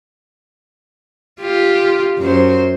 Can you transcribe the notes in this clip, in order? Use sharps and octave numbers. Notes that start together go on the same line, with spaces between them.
F4 G4
F#2 C5